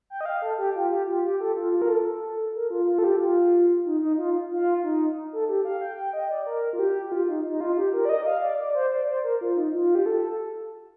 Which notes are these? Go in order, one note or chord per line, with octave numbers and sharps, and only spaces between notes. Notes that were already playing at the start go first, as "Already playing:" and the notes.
G5
D#5
F5
A4
G4
F4
G4
F4
G4
A4
F4
F4
A#4
A4
A#4
F4
F4
A4
G4
F4
D#4
D#4
F4
F4
D#4
A4
G4
F5
G5
G5
D#5
D5
A#4
F4
G4
G4
F4
D#4
D#4
F4
G4
A#4
D5
D#5
F5
D5
D5
C5
D5
C5
A#4
F4
D#4
F4
G4
A4